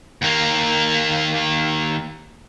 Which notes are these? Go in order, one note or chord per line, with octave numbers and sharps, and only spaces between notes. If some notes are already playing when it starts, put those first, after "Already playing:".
D#2 A#3